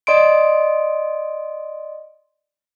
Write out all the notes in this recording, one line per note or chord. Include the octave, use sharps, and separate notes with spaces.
D5 D#5 C6 D7